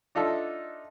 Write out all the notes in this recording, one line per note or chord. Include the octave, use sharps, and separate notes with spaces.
D4 D#4 F4 A4 E5